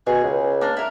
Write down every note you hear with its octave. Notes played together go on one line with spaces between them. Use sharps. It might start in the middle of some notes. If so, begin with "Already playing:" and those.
B2 G#4
C#2
A#3 D4
E4 A#4